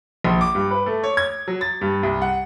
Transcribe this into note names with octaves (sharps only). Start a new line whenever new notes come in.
A#1
D6
G2
B4
A3
C#5
G#6
F#3
A6
G2
C2
F#5